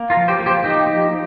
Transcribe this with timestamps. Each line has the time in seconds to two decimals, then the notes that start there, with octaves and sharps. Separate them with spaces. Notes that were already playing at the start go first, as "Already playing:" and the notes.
Already playing: A#3
0.10 F4 A#4
0.17 F3
0.28 G4 C5
0.40 A#3
0.46 G4 C5
0.64 A#3 D#4 G4
0.87 F3